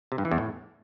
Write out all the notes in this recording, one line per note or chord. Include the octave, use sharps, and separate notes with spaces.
C3
G2
E3
E2
A2